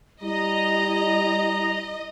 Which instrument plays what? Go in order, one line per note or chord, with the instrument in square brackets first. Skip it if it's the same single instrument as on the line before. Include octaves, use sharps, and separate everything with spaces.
[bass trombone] G3 [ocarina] E4 [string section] D#5 [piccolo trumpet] A#5